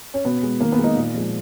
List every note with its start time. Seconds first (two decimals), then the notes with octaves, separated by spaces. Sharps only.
0.14 C#4
0.25 B2 B3
0.43 G#3
0.60 D#3 A#3
0.72 B3
0.78 G#3
0.84 B3 D#4
0.96 A#2
1.14 F3 G#3